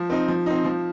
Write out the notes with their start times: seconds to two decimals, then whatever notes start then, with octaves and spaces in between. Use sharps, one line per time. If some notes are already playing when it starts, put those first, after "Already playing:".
Already playing: F3
0.10 C4 D#4
0.28 F3
0.46 C4 D#4
0.65 F3